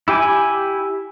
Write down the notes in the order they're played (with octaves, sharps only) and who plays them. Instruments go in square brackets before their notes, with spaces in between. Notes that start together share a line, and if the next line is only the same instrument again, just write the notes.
[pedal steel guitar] E4 G4 G5 G#5